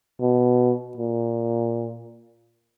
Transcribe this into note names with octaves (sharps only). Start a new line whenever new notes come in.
B2
A#2